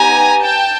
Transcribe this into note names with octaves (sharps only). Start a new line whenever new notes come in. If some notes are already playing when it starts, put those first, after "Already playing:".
Already playing: B3 D#4 G4 G#5 A#5
G5 A5